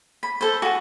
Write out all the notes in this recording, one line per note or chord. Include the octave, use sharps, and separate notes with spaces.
B5
A4 C5
F#4 G#4